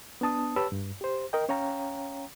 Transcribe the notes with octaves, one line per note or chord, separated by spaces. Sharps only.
B3 D4 A5 D#6
G4 B4 C#5 A5 B5 E6
G2
G4 C5
A#4 D#5 G5
C#4 C#5 F5 G5 A#5